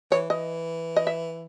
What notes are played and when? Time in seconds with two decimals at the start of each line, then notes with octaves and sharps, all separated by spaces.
0.11 E3 C#5
0.30 E3 D#5
0.96 D#5
1.07 E5